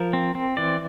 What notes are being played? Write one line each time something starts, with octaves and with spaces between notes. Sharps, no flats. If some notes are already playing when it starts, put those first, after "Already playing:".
Already playing: F3 A#4
C4
C4
E3 D5